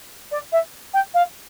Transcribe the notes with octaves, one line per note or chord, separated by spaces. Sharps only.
D5
E5
G5
F5